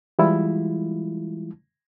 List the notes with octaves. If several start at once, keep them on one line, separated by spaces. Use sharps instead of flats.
E3 G3 G#3 E4 F4